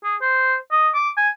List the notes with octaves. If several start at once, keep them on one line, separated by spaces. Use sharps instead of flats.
G#4
C5
D#5
D6
G#5